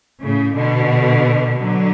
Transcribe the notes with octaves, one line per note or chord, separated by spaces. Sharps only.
A2 C#3
B2 D3
D3 F#3